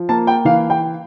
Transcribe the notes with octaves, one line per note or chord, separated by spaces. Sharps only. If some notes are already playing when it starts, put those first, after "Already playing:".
Already playing: F3
A#3 A5
G5
E3 F5
G5